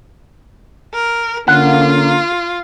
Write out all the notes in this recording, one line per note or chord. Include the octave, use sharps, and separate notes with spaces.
A#4
D3 A#3 C#4 F4 F#5